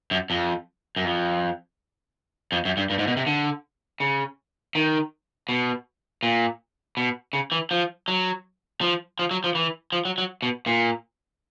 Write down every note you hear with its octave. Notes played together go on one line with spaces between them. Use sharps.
F#2
F2
F#2
F2
F2
F#2
G2
G2
G#2
B2
C3
D3
C#3
D#3
B2
A#2
B2
C#3
E3
F3
F#3
F3
F3
F#3
F3
E3
F3
F#3
F#3
B2
A#2